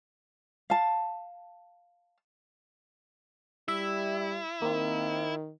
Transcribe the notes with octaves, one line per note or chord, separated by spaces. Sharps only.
F5 A5
G3 E4 E5
D#3 A#3 C4